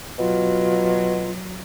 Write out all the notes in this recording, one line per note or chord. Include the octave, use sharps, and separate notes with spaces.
B2 F#3 F4